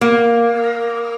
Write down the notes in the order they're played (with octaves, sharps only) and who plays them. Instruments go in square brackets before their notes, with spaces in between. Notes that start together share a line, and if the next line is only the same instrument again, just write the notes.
[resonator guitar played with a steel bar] A#3